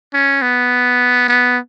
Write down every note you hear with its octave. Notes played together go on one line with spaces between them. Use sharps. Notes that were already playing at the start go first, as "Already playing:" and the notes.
C#4
B3
B3